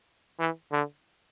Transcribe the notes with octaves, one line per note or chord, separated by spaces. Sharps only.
E3
D3